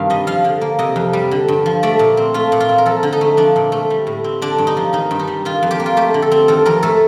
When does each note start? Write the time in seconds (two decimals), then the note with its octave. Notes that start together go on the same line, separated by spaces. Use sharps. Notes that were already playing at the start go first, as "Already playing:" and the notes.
Already playing: G2 C3 D#3 F5
0.10 G3 D#5
0.27 F3 F5
0.44 D3
0.61 A#3
0.79 C3 D#5
0.96 F2
1.13 G3
1.31 D3
1.48 G2
1.66 F3
1.83 A3 D5
1.99 A#2
2.17 C4
2.34 A3 F4
2.52 A#2
2.60 F4
2.69 C4
2.78 A#4
2.86 F3 A4
3.03 D3
3.13 D#4
3.21 A3
3.37 F3 D4
3.56 A#2
3.72 A3
3.90 G3
4.07 A2
4.24 C4
4.42 D3 D4
4.58 G2
4.67 D#4
4.77 F3
4.93 D#3 D#4
5.11 G2
5.19 D#4
5.27 G3
5.45 D#3 F4
5.63 F2
5.71 G4
5.80 A#3
5.86 F4
5.97 A3 G4
6.14 D3
6.22 A4
6.31 C4
6.48 D#3 A4
6.66 F2 A#4
6.83 A3 A4